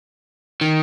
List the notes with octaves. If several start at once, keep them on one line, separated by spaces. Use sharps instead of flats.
D#3